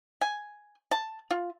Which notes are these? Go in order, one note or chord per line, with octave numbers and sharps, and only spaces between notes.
G#5
A5
F4